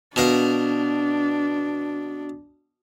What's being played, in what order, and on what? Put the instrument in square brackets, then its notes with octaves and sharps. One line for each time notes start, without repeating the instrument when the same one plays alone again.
[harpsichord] B2 A#4 F5 [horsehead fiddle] D4